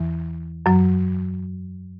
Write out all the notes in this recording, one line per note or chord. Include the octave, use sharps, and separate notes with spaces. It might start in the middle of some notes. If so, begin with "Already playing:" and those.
Already playing: E2 E3
F#2 F#3